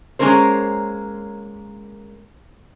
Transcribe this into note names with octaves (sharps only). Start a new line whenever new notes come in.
G#3 A#3 C#4 A#4 C5